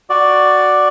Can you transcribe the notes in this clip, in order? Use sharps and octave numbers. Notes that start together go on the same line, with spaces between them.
F#4 D5